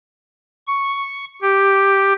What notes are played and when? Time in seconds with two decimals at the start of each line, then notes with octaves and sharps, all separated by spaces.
0.67 C#6
1.42 G4